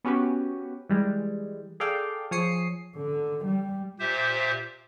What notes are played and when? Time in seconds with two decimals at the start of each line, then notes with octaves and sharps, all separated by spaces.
0.04 B3 C#4 F#4 G4 B4
0.89 E3 G3 G#3
1.80 G#4 A4 D5 F5 G5
2.31 F3 G#4 C#5 D#6 C7 C#7
2.96 D3
3.45 G3
4.00 A#2 G4 C5 E5